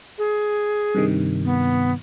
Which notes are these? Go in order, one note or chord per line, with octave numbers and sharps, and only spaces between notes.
G#4
G2 C3 D#3
B3